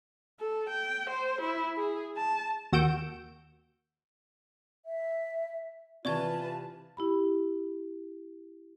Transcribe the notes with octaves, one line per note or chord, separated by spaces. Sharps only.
A4
G5
C5
E4
G#4
A5
D#2 F#4 E6 G6 D7
E5
C3 E3 F4 B4 D5 A5 C#6 G#6
E4 G4 B5